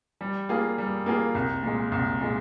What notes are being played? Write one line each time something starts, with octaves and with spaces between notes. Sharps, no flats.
G3
A#3 F4 G#4
G3
A#3 F4 G#4
C2
A#2 G#3
C2
A#2 G#3